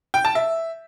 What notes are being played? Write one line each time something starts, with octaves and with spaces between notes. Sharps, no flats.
G5
A5
E5